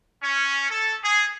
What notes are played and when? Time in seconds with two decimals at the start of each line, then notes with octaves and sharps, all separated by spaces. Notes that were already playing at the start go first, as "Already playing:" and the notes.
0.23 C#4
0.70 A4
1.03 G#4